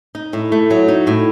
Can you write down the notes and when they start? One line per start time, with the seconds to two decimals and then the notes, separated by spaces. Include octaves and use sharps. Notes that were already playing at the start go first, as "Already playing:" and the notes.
0.15 D#4
0.33 A2
0.52 A3
0.71 F#3
0.88 D#4
1.07 A2